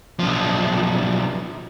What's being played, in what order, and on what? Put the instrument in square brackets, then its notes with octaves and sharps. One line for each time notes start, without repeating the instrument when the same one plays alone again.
[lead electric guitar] B1 F3